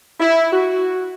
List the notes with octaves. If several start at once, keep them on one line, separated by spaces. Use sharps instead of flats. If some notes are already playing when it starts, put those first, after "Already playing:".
E4
F#4